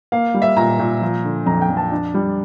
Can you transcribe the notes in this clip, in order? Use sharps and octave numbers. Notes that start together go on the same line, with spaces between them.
A#3 F5
G3
E5
A#2 A#5
A#2
F3
D3
F2 A#5
G5
F2
A5
D4
G3